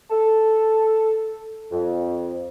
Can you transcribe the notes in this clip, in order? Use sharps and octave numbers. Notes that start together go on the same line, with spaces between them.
A4
F2